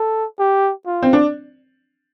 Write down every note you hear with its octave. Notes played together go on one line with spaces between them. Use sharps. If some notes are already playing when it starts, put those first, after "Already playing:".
Already playing: A4
G4
F4
C4
D4